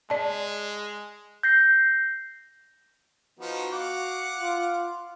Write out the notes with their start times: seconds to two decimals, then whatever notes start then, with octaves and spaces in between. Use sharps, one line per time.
0.10 G#3 D5 A5
1.43 G6 A#6 C7
3.40 F3 B3 D#4 F#4
3.72 F5 F#5 D6
4.40 F4